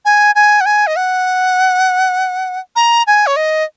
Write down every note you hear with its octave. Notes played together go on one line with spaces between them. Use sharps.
G#5
G#5
F#5
G#5
D#5
F#5
A#5
G#5
C#5
D#5